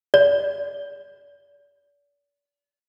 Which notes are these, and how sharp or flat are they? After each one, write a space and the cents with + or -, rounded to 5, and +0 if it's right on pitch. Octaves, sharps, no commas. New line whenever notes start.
D5 -40